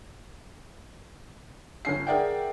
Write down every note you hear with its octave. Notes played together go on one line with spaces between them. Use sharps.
G1 C#4 C7
G#4 A#4 D5 E5 F#5 G5